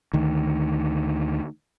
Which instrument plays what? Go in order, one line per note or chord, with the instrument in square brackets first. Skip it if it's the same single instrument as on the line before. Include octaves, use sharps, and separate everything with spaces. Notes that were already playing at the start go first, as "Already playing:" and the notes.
[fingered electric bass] D2 D#3